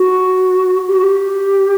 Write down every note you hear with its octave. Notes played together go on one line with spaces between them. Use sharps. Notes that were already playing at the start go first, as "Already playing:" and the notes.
Already playing: F#4
G4
F#4
G4